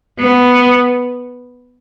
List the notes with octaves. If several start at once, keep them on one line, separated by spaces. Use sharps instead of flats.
B3